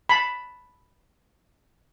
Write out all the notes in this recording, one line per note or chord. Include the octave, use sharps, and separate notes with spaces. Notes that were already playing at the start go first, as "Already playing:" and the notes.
A5 B5